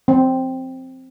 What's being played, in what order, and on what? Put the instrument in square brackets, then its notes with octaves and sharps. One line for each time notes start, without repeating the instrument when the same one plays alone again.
[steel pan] C4